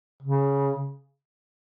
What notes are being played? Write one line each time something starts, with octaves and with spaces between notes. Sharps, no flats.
C#3